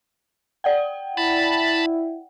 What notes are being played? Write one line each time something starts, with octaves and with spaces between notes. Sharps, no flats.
D5 F#5 G5
E4 A5 B5